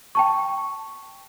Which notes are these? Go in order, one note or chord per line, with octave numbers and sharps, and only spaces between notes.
G5 A5 C#6